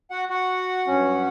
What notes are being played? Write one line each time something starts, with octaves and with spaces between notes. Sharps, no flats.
F#4 F#5
F#4 F#5
G2 F#3 C#4